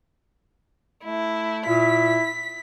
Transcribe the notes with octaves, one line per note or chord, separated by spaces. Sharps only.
A3 E4
A#2 E4 B6